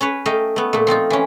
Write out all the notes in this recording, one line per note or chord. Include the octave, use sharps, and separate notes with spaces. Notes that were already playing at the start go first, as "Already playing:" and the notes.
C#4 B4 C#5
A3 D#5 F5 G5
A3 B3
A#2 A3
F3 C4 D#4 F4
E3 C#4